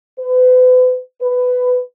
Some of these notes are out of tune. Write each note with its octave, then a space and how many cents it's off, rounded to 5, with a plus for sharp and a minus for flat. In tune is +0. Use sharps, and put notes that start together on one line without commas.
B4 +40
B4 +15